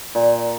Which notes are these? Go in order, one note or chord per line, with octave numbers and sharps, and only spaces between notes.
A#2